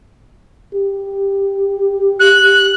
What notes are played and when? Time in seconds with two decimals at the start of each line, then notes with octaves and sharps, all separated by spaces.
0.74 G4
2.20 F#6